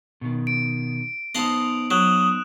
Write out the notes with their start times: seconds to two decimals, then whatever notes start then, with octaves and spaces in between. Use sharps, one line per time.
0.21 B2 D#3
0.47 D7
1.35 B3 D#4 C5 D#5 F5 A5 D#6 F#7
1.91 F#3 D#6 F#6 E7